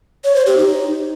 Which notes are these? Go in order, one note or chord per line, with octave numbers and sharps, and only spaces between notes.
C#5
C5
G4
D#4